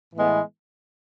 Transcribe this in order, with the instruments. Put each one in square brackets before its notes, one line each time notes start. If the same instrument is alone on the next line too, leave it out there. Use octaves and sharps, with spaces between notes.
[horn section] A2 E3 G#3 B3